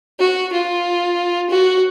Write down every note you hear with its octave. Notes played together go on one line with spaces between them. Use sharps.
F#4
F4
F#4